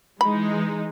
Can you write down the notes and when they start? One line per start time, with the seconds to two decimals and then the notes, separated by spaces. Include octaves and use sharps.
0.21 E3 G#3 D#4 B5